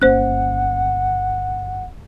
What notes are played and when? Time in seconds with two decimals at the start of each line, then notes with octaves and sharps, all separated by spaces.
0.02 G1 A#3 C#4 C5 F#5 F#6